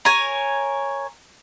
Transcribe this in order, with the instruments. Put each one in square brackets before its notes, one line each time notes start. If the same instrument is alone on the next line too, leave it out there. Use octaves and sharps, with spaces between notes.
[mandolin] A#4 C#5 G#5